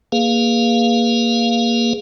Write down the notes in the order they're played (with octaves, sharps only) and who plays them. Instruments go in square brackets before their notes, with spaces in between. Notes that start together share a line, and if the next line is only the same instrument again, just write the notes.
[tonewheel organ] A#3 G#4 B4 F5